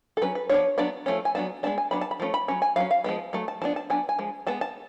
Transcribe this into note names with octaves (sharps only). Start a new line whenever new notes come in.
A4
F#3 C#4 B4
B4
F3 B3 D4 C#5
F#3 B3 D4 D5
F3 A3 C#4
G#5
F#3 B3 D4 A5
G#3 B3 D4 A5
G#5
F#3 B3 D4 B5
A5
B5
F3 A3 C#4
B5
F#3 C#4
G#5
F#3 C#4 F5
F5
F3 G#3 B3
F#3 A3
A5
F3 B3 D4 A5
A5
F#3 B3 D4 G#5
G#5
F3 G#3
G#3 B3 A5
A5